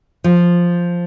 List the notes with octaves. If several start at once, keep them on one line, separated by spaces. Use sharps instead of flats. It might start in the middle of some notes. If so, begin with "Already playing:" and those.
F3